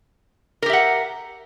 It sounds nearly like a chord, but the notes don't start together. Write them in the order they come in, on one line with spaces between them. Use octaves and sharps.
A#4 G4 E5 F#5